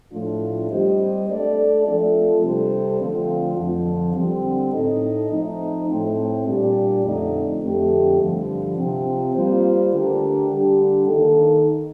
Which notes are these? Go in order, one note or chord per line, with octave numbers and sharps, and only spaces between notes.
A2 F3 A3 D4 F4
G3 C4 G4 C5 D#5
A3 D4 A4 D5
F3 A3 C4 F4 A4
C3 G3 D4 A4 C5
D3 F3 A3 C4 F4
F2 D3 F3
D3 G3 C4
A2 A3 D#4 A4 D#5
F3 A3 C4 D#4
A2 A3 C4
A#2 G3 D4 G4 D5
F2 D3 A3 C4 D#4
F2 D3 A3 C4 G4
G2 D3 F3
C3 F3 C4
G3 A#3 F4 C5
D3 A3 D4 G4 A#4
D3 G3 D4 G4
D#3 A#3 D#4 A4